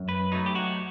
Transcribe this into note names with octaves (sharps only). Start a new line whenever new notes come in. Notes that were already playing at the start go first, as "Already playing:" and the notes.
Already playing: F#2
B4
F#3 A3 D#4
G4
F#4